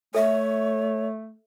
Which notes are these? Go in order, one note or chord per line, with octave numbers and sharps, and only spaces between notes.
A3 A4 C#5 E5